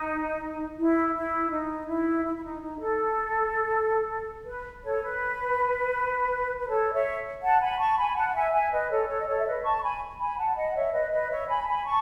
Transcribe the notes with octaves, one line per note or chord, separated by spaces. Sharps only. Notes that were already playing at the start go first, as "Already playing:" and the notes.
Already playing: D#4
E4
E4
D#4
E4
E4
E4
D#4
D#4
A4
B4
A4 C#5
B4
B4
A4 C#5
C#5 E5
F#5 A5
G#5 B5
A5 C#6
G#5 B5
F#5 A5
A5
E5 G#5
E5 G#5
B4 D#5
A4 C#5
A4 C#5
D#5
A4 C#5
E5
B4 D#5
A5 C#6
C#6
G#5 B5
G#5 B5
F#5 A5
D#5 F#5
C#5 E5
B4 D#5
B4 D#5
C#5 E5
G#5 B5
A5
G#5 B5
A5 C#6